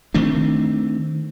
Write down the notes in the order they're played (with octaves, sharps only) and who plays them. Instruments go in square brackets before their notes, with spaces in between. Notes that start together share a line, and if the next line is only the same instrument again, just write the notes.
[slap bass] D#3 A3 C4 D4